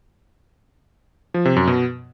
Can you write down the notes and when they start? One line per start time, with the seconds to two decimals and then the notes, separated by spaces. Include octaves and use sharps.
1.34 F3
1.45 C3
1.56 F#2
1.67 B2